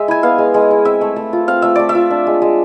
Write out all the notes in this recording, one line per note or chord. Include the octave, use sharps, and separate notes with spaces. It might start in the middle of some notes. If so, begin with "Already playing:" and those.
Already playing: G#3 E5
E4 G#5
B3 F5
G#3
G#3
E4
C4 E5
A3
A3
F4
C4 F5
A3 E5
A3 D5
E5
F4
D4
G#3
G#3